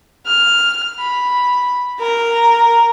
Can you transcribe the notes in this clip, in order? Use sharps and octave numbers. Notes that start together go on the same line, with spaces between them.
F6
B5
A#4 A#5